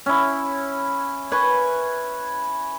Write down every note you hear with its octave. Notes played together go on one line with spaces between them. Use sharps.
C#4 E4
B4 G#5 C#6